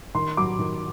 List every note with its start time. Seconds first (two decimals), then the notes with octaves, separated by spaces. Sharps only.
0.15 D#3 C6
0.37 F#3 D6
0.59 D#3